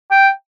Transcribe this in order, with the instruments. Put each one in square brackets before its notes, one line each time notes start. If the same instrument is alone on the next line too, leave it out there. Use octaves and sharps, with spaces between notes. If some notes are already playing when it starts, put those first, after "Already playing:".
[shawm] G5